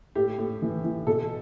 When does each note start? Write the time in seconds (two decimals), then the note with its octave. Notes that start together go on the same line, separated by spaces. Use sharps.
0.15 A2 G4
0.39 A2
0.62 E3
0.84 E3
1.07 B2 A4